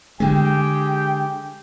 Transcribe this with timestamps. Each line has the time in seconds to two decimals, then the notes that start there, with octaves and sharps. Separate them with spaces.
0.20 D3 G#3 G4 G#4 G5